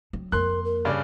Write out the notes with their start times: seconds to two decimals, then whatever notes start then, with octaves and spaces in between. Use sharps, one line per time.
0.13 F#3 C4
0.32 F2 A#3 A#4 C6 F#6
0.65 A#4
0.85 G2 C#3 D5